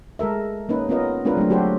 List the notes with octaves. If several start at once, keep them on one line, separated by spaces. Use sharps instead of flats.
G#3 A4 A#4 E5
A#3 C#4 D#4 B4
B3 C#4 F4 A#4 D#5
G#3 C4 D4 F4 A#4 B4
F#3 A3 D4
F#3 F#4 G4 A4 C5